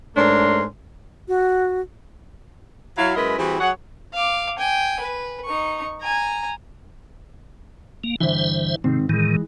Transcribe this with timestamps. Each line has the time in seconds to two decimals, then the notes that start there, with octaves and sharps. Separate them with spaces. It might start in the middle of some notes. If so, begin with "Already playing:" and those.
0.17 G#2 A3 C#4 D4 A#4 C6
1.28 F#4
2.98 F#3 E4 F5
3.16 F#2 G#3 E4 A#4 B4 D#5
3.38 E3 G3 C4 E4 F#4 G#4
3.60 F#3 G#4 C#5 F#5
4.13 F5 D6
4.59 G5 G#5
5.00 B4
5.45 D#4 C#6
6.01 G#5 A#5
8.04 A#3
8.20 G2 D3 E3 C5 E5
8.84 G#2 C3 D#3 C4
9.09 A2 D#3 E3 G#3